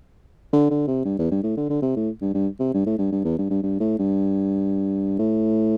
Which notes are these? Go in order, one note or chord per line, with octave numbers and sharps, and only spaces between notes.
D3
D3
C3
G2
E2
G2
A2
D3
D3
C3
A2
G2
G2
C3
G2
A2
G2
G2
E2
G2
G2
G2
A2
G2
A2